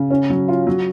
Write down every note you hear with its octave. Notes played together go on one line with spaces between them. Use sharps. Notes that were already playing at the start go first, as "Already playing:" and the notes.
Already playing: C#3
C#4
F#3
F4
F#3